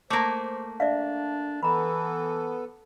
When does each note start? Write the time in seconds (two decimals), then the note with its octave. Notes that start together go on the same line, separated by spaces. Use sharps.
0.10 A3 A#3 C5 D6
0.80 D4 D5 E5 F5
1.63 E3 B3 A4 A#5 B5